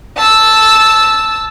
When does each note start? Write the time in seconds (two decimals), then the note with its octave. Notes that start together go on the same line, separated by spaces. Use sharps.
0.17 A5 E6